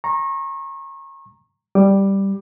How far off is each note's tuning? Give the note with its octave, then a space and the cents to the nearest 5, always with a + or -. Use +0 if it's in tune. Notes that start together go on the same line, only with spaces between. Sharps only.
A#5 +0 C#6 -35
G3 +0 D6 +10